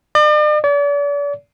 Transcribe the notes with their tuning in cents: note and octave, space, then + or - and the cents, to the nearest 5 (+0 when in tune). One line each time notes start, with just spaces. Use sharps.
D5 +45
D5 -40